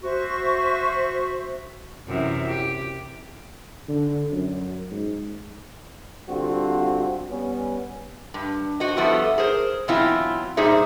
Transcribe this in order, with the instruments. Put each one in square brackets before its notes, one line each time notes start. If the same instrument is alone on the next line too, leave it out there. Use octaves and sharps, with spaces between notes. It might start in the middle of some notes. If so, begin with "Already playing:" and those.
[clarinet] F#4 [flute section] C5 E5 C#6
[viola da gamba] F#2 C3 E3
G4
[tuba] D3
F#2
G#2
[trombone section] D3 G3 C4 F4 F#4
G3 B3 C#4
[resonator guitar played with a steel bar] G2
F#4 C5 D#5
F3 G3 B3 E4 A4
G#4 A#4 C5
B2 E3 F#3 C4 E4 F4
A#2 G3 D#4 G#4 C5 E5